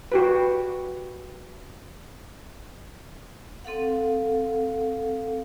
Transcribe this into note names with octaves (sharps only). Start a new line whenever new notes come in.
F#4 G4 B4
C4 A4 F5 F#5